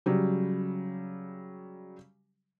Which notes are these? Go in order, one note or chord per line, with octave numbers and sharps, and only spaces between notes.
C#3 F#3 G3